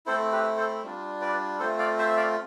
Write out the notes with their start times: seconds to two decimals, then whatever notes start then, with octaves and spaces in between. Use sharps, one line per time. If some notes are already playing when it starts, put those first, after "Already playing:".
0.06 A3 C4 E4 A4 C5
0.32 G4 B4
0.57 A4 C5
0.83 G3 D4 F4
1.21 B4 D5
1.59 A3 C4 F4 A4 C5
1.79 D5 F5
1.99 C5 E5
2.09 E5
2.17 D5 F5